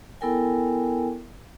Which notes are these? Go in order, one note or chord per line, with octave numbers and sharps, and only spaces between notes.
B3 E4 A4 A#4 G5 G#5